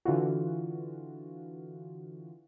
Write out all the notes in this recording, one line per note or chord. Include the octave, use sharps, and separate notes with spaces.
D3 E3 F4 F#4